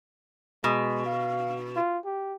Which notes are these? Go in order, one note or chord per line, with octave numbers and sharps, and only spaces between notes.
B2 G#3
F5
F4
G4